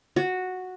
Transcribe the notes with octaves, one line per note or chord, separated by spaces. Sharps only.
F#4